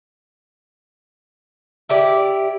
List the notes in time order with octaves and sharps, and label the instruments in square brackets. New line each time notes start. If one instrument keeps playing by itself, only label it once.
[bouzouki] E4 G4 D5